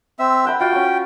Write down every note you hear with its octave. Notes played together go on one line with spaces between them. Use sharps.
C4 E5
F#5 G5 B5
F4 F#4 G5
C#4 C#6